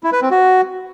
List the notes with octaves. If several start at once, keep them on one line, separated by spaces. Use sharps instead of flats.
E4
B4
C4
F#4